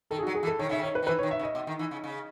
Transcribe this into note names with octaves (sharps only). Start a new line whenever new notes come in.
D#3 A4
G#4
F#3 F#4
G#4
E3
A4
D#3 C#5
C#3 E5
D#3
C#5
B4
D#3
E3 B4
D#3 C#5
E5
C#3
D#5
B2
D#3
E3
C#3
C#3